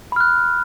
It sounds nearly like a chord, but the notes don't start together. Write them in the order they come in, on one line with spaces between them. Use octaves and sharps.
B5 F6 F#6